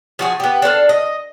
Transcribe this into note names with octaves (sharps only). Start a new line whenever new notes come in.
F3 F#4 G#4
B3 G4
D4 A4 C5 F5
D#5